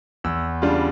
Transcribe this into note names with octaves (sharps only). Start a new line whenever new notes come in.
E2 E6
C#3 G3 D4 F4